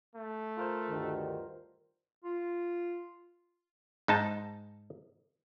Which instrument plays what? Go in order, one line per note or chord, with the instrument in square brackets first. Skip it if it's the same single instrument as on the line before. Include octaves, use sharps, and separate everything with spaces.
[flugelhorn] A3
[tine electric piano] F4 A#4 C5
[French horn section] D2 G2 D#3
[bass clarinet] F4
[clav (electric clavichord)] G#2 D#4 A5